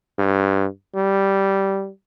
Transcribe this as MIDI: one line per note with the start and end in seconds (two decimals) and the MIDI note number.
0.19 0.66 43
0.96 1.89 55